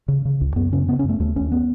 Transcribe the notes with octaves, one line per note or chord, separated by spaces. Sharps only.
C#3
C#3
C#2
F#2 B3
C#3 C#4
C#3 B3
C#4
F#2 A3
D#2 A3
D#2 C#4
B3